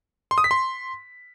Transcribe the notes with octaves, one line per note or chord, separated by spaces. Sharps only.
C6
D#6
B6
C6